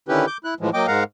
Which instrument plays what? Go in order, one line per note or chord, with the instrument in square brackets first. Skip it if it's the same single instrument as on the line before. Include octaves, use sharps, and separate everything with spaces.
[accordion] D3 D#3 C#4 E4 G4 B4
D6 G6
E4 F#6
A2 E3 F3 G#3
F#3 A#3 D#5 G5 D6
G#2 G#3 A#4 F5 F#5 A#5